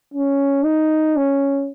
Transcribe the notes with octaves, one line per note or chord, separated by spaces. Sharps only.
C#4
D#4
C#4